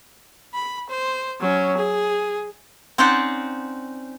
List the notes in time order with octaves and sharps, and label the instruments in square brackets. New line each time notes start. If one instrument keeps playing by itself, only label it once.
[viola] B5
C5
F#3 C#4
G#4
[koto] C4 C#4 D#4 C5 D5 F#5